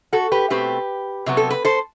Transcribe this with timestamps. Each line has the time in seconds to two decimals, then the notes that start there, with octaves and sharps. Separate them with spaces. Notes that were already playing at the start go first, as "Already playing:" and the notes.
0.13 F#4 A4
0.32 G4 B4
0.50 B2 A3 C4 G4 B4
1.26 C3 F#3 B3
1.37 A4
1.50 B4
1.65 A4 C5